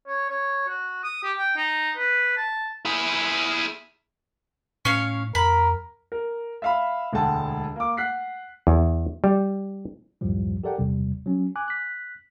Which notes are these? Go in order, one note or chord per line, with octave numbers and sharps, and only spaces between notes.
C#5
C#5
F#4
D#6
G4
G5
D#4
B4
A5
E4 G#4
A2 C#4 C#5 F5
F2 A#4 B5
A#4
E5 F5 B5
E1 D2 G#3 F#5 G5 A5
A#3 D6
F#5 F#6 B6 C7
E2
G3
C#2 F#2 A2 F3 G3
G4 A4 A#4 D5 F#5 G5
G#1 E2 C3 G3
F#3 C#4
G#5 D6 F#6
F#6 B6